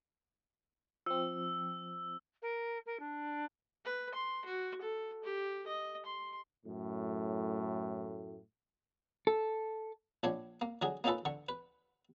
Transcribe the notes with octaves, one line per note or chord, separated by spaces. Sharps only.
F3 C4 E6
A#4
A#4
D4
B4
C6
F#4
A4
G4
D#5
C6
F#2 A2
A4
A#1 F3 D4 C#5
A#3
D3 F#3 F#4 G#4
A#3 C#4 D#4 F4 A4 B4
D3 C#6
B4